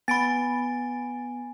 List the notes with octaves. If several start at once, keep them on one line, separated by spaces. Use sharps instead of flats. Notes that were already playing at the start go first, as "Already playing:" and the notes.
B3 G#5 B5 A6 D7